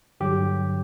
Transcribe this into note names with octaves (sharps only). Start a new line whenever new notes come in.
G2 D3 F#3 G4